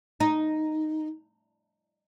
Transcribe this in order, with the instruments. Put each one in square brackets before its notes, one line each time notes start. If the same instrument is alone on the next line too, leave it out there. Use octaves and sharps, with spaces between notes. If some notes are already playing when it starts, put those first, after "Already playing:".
[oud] D#4